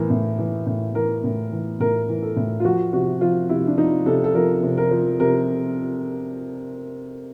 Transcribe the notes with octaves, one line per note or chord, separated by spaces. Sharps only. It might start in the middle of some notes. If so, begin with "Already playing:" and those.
Already playing: A2 E3 A#4
A2
E3
A2
E3 A#4
A2
E3
A2 A#4
E3
A4
A2
F4
F3 F#4
C3 F#4
F3 F4
C3 E4
D4
F3 D#4
C3 A4
A4
F3 A#4
C3
A#4
F3
C3 A#4